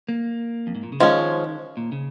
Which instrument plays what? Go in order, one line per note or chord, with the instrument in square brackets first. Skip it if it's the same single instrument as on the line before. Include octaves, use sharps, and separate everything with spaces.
[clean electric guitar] A#3
F2
G#2
A#2
C#3
[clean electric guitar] D#3 [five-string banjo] F3 G#3 C#4
[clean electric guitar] A#2
C#3